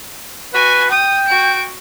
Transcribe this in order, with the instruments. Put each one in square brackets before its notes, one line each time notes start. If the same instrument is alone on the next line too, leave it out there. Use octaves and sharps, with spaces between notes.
[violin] F#4 G#5 [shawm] B4
[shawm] G5 [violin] D#6
[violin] F#4 D7